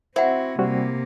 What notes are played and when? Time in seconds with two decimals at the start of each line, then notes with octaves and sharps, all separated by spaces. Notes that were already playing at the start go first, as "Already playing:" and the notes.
0.16 C4 E4 F#4 C5 F#5
0.59 C3 G3 A#3 C4 F#4